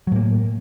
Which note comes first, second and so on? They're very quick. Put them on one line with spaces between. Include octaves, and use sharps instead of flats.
F#3 A2 A#3